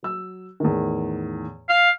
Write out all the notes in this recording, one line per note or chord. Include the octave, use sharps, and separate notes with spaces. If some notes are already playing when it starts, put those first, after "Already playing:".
F#3 E6
E2 A2 D#3
F5